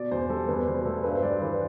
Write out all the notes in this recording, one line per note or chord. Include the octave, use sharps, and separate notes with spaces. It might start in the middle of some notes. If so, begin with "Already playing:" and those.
Already playing: B2 D5
E2 C5
G3 A4
E2 B4
B2 C5
A3 A4
G2 B4
C5
G2 D5
E3 B4